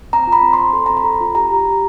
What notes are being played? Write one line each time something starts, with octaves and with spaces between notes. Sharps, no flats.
C4 A#5
F4
B5
C4
C6
C4
A4 B5
C4 A#5
B5
A4
F4
G4 A#5
G4
G4